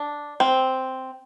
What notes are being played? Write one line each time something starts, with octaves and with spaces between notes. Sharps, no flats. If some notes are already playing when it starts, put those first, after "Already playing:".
Already playing: D4
C4